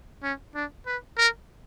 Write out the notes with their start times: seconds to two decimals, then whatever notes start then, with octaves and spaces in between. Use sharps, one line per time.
0.23 C#4
0.55 D4
0.86 B4
1.18 A#4